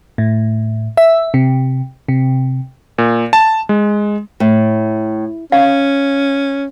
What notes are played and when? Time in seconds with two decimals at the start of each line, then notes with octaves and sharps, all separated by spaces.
0.18 A2
0.97 E5
1.34 C3
2.08 C3
2.98 A#2
3.33 A5
3.69 G#3
4.40 A2
5.52 C#4 F5